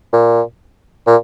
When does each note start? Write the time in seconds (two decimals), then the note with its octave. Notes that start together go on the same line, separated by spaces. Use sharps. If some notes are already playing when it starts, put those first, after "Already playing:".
0.13 A#2
1.07 A#2